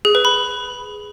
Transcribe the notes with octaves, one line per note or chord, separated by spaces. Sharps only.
G#4
B4
B5